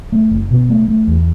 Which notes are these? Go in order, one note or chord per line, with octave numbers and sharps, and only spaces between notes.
A3
F#1
B2
A3
A3
E2